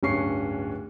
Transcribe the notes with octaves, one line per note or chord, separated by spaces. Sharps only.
D1 G2 C#4 C#6 C7